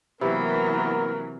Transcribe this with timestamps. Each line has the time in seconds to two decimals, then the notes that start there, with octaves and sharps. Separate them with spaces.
0.21 C3 E3 F#3 A#3 B3 A#4 B4